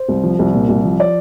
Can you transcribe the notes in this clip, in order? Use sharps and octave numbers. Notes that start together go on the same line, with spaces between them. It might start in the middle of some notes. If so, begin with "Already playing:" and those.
Already playing: C5
C2
F3
C2
A#2
C2
F3
D5